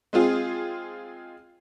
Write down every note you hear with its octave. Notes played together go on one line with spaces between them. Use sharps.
G#3 C4 F4 G#4